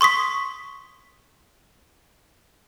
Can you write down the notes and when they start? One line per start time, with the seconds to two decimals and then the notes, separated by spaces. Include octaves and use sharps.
0.01 C6 C#6 D#6 B6